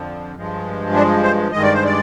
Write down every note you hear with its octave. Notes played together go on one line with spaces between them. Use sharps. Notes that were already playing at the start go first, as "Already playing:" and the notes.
Already playing: F2 D3 F3
G2 F3 G#3
D4
C5
G2 D#3 G#3 D#5
D5
C5
D5